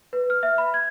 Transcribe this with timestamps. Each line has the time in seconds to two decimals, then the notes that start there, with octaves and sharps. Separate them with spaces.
0.13 B4
0.30 F6
0.43 E5
0.58 B5
0.74 G#6